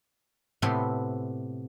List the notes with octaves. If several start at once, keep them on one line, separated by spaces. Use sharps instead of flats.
A2 C3 B3 A4 G5 C6